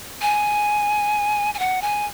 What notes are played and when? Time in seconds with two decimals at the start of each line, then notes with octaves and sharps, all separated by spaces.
0.22 G#5
1.54 G#5
1.59 F#5
1.82 G#5